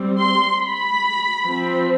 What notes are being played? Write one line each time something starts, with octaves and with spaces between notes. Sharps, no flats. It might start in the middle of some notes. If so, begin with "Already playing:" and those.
Already playing: G3 C4
C6
B5
F3 C4